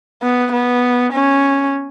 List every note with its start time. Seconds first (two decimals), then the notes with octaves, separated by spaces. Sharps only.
0.22 B3
0.52 B3
1.13 C#4